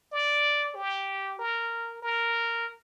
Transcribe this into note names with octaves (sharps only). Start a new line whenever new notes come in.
D5
G4
A#4
A#4